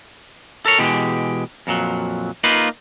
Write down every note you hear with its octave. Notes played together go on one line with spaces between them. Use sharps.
A4 A#4 C#5
B2 E3 G#3 G4
F2 A#2 F#3
A#3 D#4 F4 B4